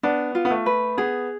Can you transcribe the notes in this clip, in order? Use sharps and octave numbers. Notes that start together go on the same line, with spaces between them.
B3 D4
F4
B3
A3
B4
B3 G#4